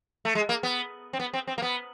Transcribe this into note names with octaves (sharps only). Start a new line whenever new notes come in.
A3
G#3
A#3
B3
C4
B3
C4
C4
A#3
B3